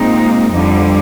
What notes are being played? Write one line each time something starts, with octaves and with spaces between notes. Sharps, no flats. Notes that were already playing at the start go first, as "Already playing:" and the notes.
Already playing: A#2 G#3 C4 D#4
F2 D3 G3